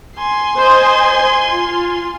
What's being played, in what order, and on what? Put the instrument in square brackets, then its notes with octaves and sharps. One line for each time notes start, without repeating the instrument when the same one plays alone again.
[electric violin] G#5 C6
[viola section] C5 D#5
F4